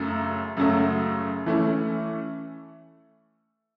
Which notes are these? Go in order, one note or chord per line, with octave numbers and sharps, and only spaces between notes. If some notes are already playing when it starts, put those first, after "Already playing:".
Already playing: F#2 C#3 F#3 A3
F#2 C#3 F#3 A3
E3 A3 C#4